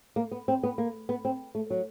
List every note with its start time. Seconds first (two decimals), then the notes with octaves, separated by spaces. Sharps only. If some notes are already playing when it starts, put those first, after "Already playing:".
0.16 A#3
0.31 B3
0.48 C4
0.63 B3
0.78 A#3
1.09 B3
1.25 C4
1.55 A3
1.70 F#3